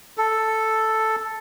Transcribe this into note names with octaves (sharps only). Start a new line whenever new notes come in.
A4